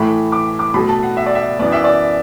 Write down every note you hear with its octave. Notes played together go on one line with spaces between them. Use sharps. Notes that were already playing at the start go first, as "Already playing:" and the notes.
Already playing: A2 E3 A3 B5
D6
D6
B2 F#3 A3 B5
A5
F#5
E5
D5
E5
F#2 E3 B3 D5
E5
D5